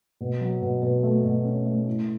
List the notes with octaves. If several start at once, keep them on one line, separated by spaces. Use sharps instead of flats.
B2
F#3
B2
B2
A3
B2
C#4
A3
A2